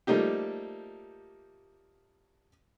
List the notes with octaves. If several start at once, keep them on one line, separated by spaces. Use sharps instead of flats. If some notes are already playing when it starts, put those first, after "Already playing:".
F3 G3 A3 A#3 D#4 G4